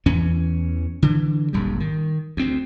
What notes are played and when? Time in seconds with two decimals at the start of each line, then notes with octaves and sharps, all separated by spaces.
0.06 E2 E3 C#4
1.02 D3 E3
1.53 D#1 G#1 F#2 G3
1.80 D#3
2.37 D2 C4